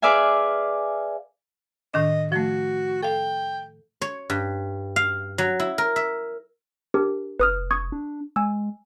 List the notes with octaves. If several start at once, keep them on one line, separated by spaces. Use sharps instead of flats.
G#4 B4 D5 E5 F5 G#5
A2 D#3 D4 D#5
F3 A3 F#4
A4 F5 G5
C#5
G2
F5
F#3
E4
A#4
E5
D4 G4 A#4
F1 B4 D#6 F6
C#6 D#6 G#6
D4
G#3 G#5 E6